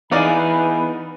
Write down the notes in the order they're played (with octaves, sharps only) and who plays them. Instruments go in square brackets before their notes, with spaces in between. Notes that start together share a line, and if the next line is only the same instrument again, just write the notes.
[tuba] E3 [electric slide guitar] B3 G#4 [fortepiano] D#4 D5 F5 [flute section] B4 B5